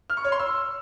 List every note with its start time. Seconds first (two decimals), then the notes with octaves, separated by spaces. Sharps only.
0.10 F6
0.17 C#6
0.25 C#5
0.32 C6
0.39 E6